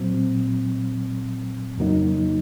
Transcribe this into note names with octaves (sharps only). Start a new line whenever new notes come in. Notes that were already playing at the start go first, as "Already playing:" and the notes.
Already playing: A#2 F#3 C4
F2 C#3 F#3 A#3 D#4